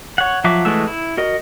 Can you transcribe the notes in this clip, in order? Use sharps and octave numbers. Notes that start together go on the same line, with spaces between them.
C#5 F#5
F3 F#3 F#4 E5 D6
E3 G#3 A3 F#4 E6
E4
F#4 A#4 D#5